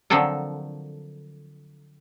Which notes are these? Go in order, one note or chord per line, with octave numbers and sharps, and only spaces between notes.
D3 F3 F#3 C4 A4 A#4